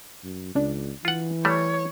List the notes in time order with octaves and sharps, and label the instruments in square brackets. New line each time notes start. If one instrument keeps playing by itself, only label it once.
[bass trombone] F#2
[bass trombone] C#2 [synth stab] C#3 D4
[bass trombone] E3 [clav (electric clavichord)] F4 F#5
[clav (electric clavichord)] G3 A3 [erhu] C#5